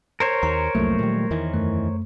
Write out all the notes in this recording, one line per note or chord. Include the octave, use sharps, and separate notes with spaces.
A#4 C5 C#5
D#2 A#5
C2 F2 F#3 A3 A#3
A#2 D#3 G3
E2 D#3 E3
F#2 A3